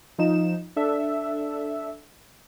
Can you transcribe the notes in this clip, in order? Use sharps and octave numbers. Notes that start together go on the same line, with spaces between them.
F3 D#4 E7
D4 A4 E5